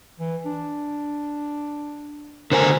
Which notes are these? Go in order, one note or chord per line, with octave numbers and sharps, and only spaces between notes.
E3
D4
D3 A#4 C5 G#5